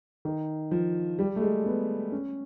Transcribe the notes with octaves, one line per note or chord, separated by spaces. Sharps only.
D#3
F3
G3
A3
G#3
B3
C#4